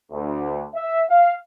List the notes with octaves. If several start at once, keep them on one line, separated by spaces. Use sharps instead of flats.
D2
E5
F5